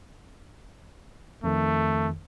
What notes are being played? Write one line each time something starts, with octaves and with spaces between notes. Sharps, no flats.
F2 D#3 A3